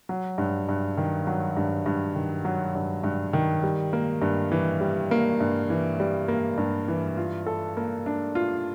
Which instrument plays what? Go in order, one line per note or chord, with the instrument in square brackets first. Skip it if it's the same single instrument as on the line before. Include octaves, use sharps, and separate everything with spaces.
[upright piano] F#3
G2
G2
D#3
F#3
G2
G2
D#3
F#3
G2
G2
D#3
G3
A#3
G2
E3
G3
A#3
G2
E3
G3
A#3
G2
E3
F4
A4
A#3
D4
F4